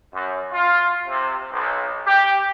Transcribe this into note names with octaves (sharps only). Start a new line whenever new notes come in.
F#2
F4
C3
B1
G4